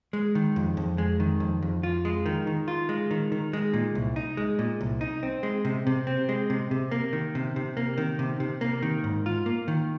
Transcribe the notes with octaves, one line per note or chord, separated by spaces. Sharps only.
G#3
D#3
F2
F2
G#3
D#3
F2
F2
F4
G#3
D#3
D#3
F4
G#3
D#3
D#3
G#3
A#2
C2
D#4
G#3
A#2
C2
D#4
C4
G#3
C3
C3
C4
G#3
C3
C3
A#3
D#3
C3
C3
A#3
D#3
C3
C3
A#3
D#3
G#2
F4
A#3
D#3